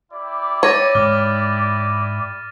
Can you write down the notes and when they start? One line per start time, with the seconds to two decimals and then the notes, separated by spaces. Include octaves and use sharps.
0.12 E4 G4 D5
0.63 C#5 A6 A#6 D#7
0.95 G#2 G#3 D6 F6